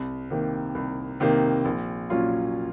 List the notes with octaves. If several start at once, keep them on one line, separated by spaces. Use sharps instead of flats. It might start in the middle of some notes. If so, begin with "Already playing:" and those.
Already playing: C2
C3 D#3 A#3
C2
C3 D#3 A#3
A#1
A#2 F#3 C#4 F4